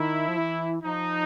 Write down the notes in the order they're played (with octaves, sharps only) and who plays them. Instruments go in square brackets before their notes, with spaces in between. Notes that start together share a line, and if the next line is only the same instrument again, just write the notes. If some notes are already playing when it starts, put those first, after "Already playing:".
Already playing: [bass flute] D#3 [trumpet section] E4
[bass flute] F3
E3
[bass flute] F3 [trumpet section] D#4